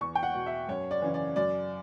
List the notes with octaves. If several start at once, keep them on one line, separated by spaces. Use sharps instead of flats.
E2 C#6
G5
F#5
B2
E5
F#2 C#5
D5
C#3 E3
D5
F#2 D5